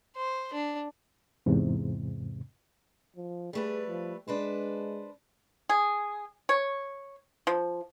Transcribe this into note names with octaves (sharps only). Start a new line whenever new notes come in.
C5
D4
E2 G#2 C3
F3
G3 A3 G#4 B4
F3
G#3 D4 B4 C5
G#4
C#5
F3